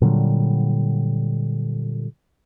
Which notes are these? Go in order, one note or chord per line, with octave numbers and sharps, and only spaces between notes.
A#2 D3 F#3 G3